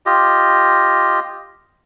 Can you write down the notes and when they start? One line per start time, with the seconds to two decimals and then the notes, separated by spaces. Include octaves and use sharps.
0.06 F4 G4 D#5